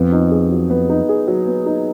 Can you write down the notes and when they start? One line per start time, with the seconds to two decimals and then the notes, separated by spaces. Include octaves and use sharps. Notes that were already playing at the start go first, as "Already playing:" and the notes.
Already playing: F2 B3
0.12 D#4
0.31 G#4
0.51 F#3
0.70 B3
0.89 D#4
1.09 G#4
1.27 F#3
1.47 B3
1.66 D#4